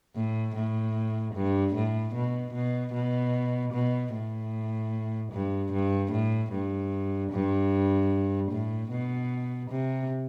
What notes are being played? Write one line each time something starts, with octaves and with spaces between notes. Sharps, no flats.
A2
A2
G2
A2
B2
B2
B2
B2
A2
G2
G2
A2
G2
G2
A2
B2
C3